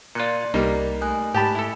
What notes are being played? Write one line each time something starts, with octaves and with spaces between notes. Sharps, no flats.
A#2 F4 D5 F#6 C#7
C2 G3 A#3 D#4
A3 G#5 F#6
G#2 G4 A5 B5
E4 A4